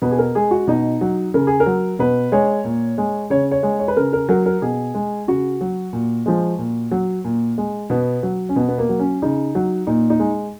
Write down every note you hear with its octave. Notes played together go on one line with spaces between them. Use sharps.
B2 B4
G#4
A#4
G#3 G#4
F#4
B2 D#4
F#3
C#3 A#4
G#4
A#4
F#3
B2 B4
G#3 C#5
A#2
G#3
C#3 C#5
C#5
G#3
C#5
B4
C#3 A#4
A#4
F#3 A#4
A#4
B2 G#4
G#3
C#3 F#4
F#3
A#2
F3 G#3
A#2
F#3
A#2
G#3
B2 B3
F#3
C#4
B2 B3
B3
A#3
F#3
C#4
C#3 D#4
F#3
A#2 D#4
D#4
G#3